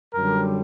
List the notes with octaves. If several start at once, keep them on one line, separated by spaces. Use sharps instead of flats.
F#2 D3 G3 A#4